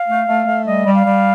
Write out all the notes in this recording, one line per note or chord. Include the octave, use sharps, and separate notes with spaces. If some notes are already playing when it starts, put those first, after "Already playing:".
Already playing: F5
A3
A3
A3
G3 D#5
G3
F5
G3